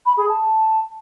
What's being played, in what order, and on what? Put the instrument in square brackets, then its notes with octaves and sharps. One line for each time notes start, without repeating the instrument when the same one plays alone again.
[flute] B5
G#4
A5